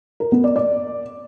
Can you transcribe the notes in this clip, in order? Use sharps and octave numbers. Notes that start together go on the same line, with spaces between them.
A#4
B3
D5
D5